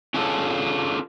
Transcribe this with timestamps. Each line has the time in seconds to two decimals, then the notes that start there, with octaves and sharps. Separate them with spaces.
0.14 C#4 D4 F4 G#4 A4 C#5